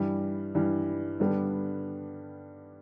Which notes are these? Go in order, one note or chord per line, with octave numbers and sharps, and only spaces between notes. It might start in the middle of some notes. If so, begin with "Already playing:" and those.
Already playing: G2 E3 G3
G2 E3 G3
G2 D3 G3 B3 D4